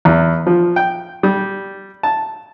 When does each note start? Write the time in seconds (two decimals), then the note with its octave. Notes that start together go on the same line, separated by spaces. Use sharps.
0.05 E2
0.47 F3
0.76 G5
1.23 G3
2.03 A5